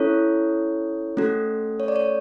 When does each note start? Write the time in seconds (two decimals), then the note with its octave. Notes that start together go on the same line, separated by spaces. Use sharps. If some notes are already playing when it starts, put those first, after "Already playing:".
Already playing: C#4 E4 A4 C#5
1.17 A3 C#4 F#4 A4
1.80 C#5
1.88 D5
1.96 C#5